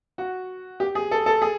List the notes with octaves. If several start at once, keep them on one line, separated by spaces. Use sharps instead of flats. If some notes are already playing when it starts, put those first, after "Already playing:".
F#4
G4
G#4
A4
A4
G#4